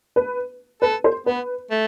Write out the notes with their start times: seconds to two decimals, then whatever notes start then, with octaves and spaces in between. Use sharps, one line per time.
0.16 B4
0.82 A4 B4
1.04 C5
1.26 B3 B4
1.71 A3